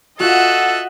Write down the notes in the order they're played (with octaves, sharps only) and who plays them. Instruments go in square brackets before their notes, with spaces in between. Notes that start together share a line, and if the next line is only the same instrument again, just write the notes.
[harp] F4 F#4 [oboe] A4 [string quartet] D#5 F#5 [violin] E5 F#6